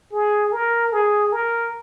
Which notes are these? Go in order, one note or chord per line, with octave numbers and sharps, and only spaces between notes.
G#4
A#4
G#4
A#4